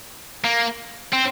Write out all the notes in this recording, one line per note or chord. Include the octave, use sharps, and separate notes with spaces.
A#3
C4